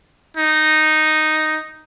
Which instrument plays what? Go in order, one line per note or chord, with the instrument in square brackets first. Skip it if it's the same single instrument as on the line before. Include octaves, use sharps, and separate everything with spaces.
[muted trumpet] D#4